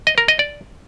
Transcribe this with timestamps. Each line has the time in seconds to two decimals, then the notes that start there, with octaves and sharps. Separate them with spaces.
0.07 D#5
0.18 A#4
0.28 D#5
0.39 D5